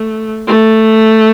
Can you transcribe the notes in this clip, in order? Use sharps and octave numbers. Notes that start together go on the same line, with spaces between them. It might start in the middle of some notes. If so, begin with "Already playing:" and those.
Already playing: A3
A3